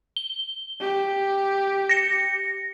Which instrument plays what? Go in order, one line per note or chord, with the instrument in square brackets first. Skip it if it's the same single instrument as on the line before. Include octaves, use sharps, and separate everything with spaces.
[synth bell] G7
[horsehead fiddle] G4
[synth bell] A#6 C#7